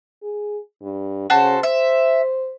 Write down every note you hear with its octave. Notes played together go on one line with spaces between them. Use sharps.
G#4
G2
C#3 F#4 A4 C5
C5 E5